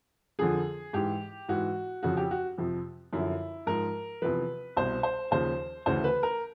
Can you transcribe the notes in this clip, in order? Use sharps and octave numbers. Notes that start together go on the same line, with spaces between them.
F2 D3 F3 G#4
G#2 E3 G4
G#2 E3 F#4
F2 C#3 F3 F#4
G4
F#4
F2 C3 F3
F#2 D3 F3 E4
G#2 F3 A#4
E2 C3 F3 B4
C2 B2 C5
C5
D#2 C#3 F3 C5
D2 C#3 E3 C5
B4
A#4